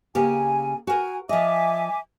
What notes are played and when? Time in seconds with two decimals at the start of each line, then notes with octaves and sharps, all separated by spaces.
0.15 C#3 A#3 G4 G#5
0.87 F#4 A#4 G#5
1.29 F3 D#5 E5 G#5 D6